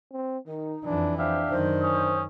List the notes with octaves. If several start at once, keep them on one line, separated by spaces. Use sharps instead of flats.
C4
D#3 D#4
F2 E3 D4
D4 G4 C5 E5 F5
F#2 D#3 C5
C#4 D#6